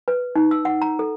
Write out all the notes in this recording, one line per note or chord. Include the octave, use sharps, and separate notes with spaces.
B4
D#4
E6
F#5
A#5
A4